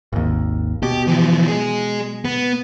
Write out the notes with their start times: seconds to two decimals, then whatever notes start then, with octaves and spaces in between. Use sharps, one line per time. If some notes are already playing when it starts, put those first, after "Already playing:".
0.13 G#1 D#2
0.83 B2 G4
1.07 E3 F3
1.48 G#3 G#4
2.25 B3